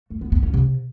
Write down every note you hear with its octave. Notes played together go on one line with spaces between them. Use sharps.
A3
B3
B3
C#4
C3